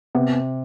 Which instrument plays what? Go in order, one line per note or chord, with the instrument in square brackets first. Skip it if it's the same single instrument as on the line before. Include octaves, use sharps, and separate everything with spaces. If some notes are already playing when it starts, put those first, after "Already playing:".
[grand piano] C3 [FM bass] B3